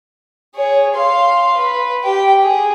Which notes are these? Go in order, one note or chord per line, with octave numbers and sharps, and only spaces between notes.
G#4 C#5
F5 C6
B4
G4 G5
G#4